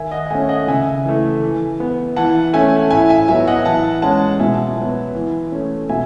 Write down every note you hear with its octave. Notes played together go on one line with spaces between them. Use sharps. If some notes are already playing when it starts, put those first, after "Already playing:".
Already playing: D#3 E5 G#5
D#5 F#5
F#5
A3 C#4 E5 G#5
D#5 F#5
C#3 E5 G#5
E3 A3
E3
B3
E3 F#5 A5
A3 C#4 E5 G#5
A2 E5 G#5
E5 G#5
F#3 B3 E5 G#5
D#5 F#5
E3 F#5 A5
G#3 C#4 F#5 A5
B2 E5 G#5
F#3 B3
E3
A3 C#4
B2 E5 G#5